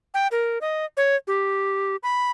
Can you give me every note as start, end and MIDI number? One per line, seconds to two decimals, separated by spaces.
0.14 0.27 79
0.32 0.58 70
0.61 0.85 75
0.97 1.16 73
1.27 1.96 67
2.03 2.31 83